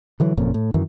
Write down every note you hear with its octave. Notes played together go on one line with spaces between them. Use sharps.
D3 E3 F#3
F#1 F2 A#2 C#3
A2
F#2 D#3 E3